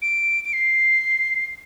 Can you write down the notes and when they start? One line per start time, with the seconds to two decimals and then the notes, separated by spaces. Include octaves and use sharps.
0.02 D7
0.44 D7
0.53 C7